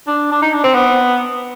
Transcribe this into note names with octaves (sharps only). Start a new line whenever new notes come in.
D4
D4
D#4
D4
C4
B3